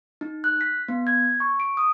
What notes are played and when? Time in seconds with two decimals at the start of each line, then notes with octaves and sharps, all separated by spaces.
0.21 D#4
0.44 F#6
0.61 B6
0.88 B3
1.07 G#6
1.40 C#6
1.60 D7
1.77 D#6